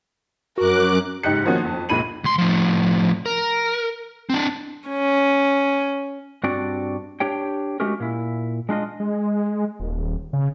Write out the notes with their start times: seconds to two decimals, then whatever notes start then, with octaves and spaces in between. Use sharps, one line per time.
0.58 F#2 F#4 A#4 D6 F#6
1.23 F#1 G#2 D#4 G4 F#6 C#7
1.45 D#3 F3 A#3 B3 C#4 F#4
1.65 F2
1.89 F#1 C#2 A#2 B5 D#7 F#7
2.24 C#2 C6
2.38 A2 F3
3.26 A#4
4.30 C4 D4
4.89 C#4
6.43 G2 C4 D4 F#4 D5
7.20 D4 G4 C#5 G5
7.80 G#3 A3 C#4 F#4 G4 A#4
8.00 A#2 E4
8.69 G#3 D4 F4 D#5
9.00 G#3
9.80 D#1
10.33 C#3